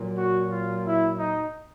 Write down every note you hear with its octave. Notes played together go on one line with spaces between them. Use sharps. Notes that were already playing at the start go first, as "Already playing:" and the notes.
Already playing: A#2 F#3
F#4
F4
E4
D#4